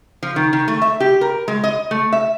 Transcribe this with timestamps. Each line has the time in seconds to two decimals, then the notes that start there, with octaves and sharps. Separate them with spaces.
0.23 F3
0.36 D#3
0.53 D#3
0.68 A3
0.82 E5
1.00 G4
1.21 A#4
1.48 G#3
1.64 D#5
1.91 A3
2.12 E5